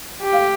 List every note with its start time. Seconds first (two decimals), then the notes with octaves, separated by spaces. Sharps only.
0.22 G4
0.33 F5